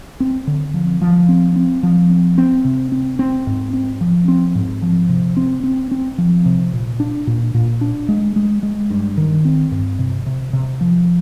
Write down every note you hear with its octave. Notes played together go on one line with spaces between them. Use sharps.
C4
D3
F3
F3
C4
C4
F3
C4
C4
C3
C4
C4
G#2
C4
F3
C4
G#2
F3
C3
C4
C4
C4
F3
C3
A#2
D4
A#2
A#2
D4
G#3
G#3
G#3
G2
D#3
C4
G2
C3
C3
C3
F3